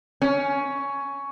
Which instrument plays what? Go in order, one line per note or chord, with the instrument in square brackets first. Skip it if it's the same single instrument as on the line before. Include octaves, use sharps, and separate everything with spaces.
[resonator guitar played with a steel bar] C#4